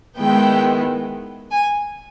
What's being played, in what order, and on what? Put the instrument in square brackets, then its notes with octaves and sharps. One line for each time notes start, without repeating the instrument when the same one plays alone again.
[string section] D#3 G#3 B3 E4 G5
G#5